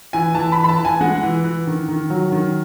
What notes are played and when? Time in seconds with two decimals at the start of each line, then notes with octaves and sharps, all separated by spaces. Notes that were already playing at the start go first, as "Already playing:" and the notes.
0.13 E3 G#5
0.35 E3 A5
0.52 B5
0.56 E3
0.64 B5
0.69 A5
0.79 E3
0.85 G#5
1.01 G#3 F#5
1.23 E3
1.44 E3
1.67 D#3
1.88 D#3
2.10 F#3
2.32 D#3